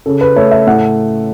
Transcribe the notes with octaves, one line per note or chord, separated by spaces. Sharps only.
C#3 A4
B4
A3 C#5
E5
A2 F#5